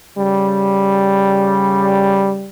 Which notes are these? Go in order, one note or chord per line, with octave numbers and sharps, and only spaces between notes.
C#3 G3